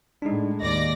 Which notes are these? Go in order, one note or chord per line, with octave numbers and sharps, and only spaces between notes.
A2 G#3 D4 D#4
D#2 D5 D#5 A#6